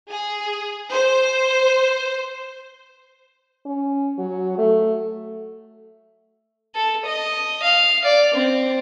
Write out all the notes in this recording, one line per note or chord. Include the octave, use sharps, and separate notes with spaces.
G#4
C5
C#4
F#3
A3
A4
D#5
F5
D5
C4